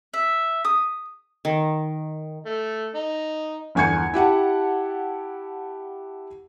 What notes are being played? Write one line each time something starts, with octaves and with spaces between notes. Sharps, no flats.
E5
D#6
D#3
A3
D#4
G1 E2 G#5 C#6 G#6 C#7
E4 G4 F#5 A5